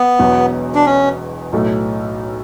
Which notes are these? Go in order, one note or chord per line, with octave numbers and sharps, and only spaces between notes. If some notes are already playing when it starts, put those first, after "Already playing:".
Already playing: B3
E1 E2 B2 F#3
D4
C#4
B1 A2 F#3 A3